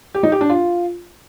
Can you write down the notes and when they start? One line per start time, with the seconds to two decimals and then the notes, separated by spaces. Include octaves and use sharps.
0.14 G4
0.23 D#4
0.32 G4
0.41 D4
0.49 F4